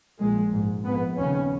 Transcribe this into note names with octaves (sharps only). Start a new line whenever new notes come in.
A#1 A#2 G#3
A#1 G#2
A#1 G#2 B3
D#2 C#3 C#4